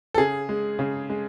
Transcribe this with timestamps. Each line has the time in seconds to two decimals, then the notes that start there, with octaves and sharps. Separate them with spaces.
0.14 A4
0.18 C#3 G#4
0.49 G#3
0.79 C#3
1.10 G#3